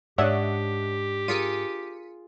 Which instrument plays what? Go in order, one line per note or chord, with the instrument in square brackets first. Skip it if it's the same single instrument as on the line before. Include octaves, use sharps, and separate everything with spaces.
[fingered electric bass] G#2 [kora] D4 D#5 [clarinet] G4 [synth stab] C#5 E5 F#5
[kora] F4 G#4 A#4 [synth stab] B6 C#7 D#7